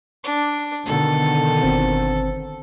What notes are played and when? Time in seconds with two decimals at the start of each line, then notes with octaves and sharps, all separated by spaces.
0.24 D4
0.86 B2 D3 D#3 A4
1.63 G1 C4 C5